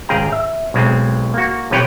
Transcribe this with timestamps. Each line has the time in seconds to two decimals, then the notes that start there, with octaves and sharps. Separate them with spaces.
0.09 G#1 C#2 G#4 F5 G5 A#5
0.32 E5
0.74 B1 B2 G#3 C4
1.34 A#3 F#4
1.71 B1 C3 E3 B4 C#5 G5